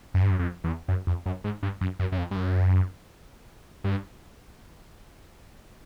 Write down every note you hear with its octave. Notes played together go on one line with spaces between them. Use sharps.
F#2
G2
F#2
F2
E2
F#2
F2
F#2
G#2
G2
F#2
F#2
F#2
F2
G2
F#2
G2